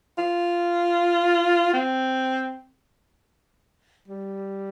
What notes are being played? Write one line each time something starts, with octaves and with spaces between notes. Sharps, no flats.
F4
C4
G3